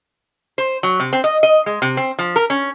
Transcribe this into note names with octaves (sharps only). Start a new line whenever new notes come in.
C5
F#3
C3
C4
D#5
D#5
G#3
C3
C4
F3
A#4
C#4